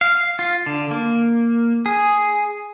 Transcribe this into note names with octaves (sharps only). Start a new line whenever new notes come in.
F5
F4
D3
A#3
G#4